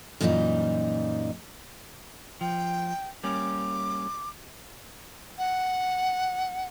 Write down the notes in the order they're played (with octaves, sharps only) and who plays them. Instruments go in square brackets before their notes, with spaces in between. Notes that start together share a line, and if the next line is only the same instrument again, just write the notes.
[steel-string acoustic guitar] F#2 A#2 E3 G3 C#4 D#4
[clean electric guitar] F3 [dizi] G5
[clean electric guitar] G3 A#3 C#4 [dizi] D6
[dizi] F#5